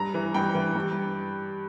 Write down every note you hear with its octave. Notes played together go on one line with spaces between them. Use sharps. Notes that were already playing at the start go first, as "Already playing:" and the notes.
Already playing: G2 A#5
E3
G2 G5
E3
G2